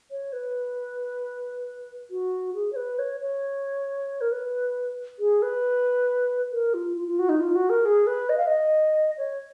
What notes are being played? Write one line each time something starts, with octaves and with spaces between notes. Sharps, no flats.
C#5
B4
F#4
G#4
C#5
B4
C#5
C#5
A#4
B4
G#4
B4
A#4
F4
F4
F4
F#4
D#4
F4
F#4
A#4
G#4
B4
D#5
F5
D#5
C#5